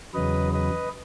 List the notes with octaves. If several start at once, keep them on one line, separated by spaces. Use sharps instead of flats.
E2 C#3 F#3 B4 D#5
B4 D#5